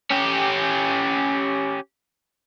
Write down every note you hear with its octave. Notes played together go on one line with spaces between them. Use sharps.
C#4 G4